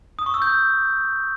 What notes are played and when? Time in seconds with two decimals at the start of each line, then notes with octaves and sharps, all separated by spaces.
0.19 D#6
0.26 C#6
0.34 E6
0.42 G6
0.49 E6